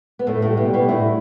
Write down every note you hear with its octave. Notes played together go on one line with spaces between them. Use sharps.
B3
A2 A3 A4
A2 G3 A3
B2 B3
G3
B2 B3
A2 A3 E4